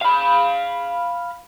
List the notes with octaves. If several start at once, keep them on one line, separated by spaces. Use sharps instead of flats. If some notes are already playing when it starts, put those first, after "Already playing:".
F5 B5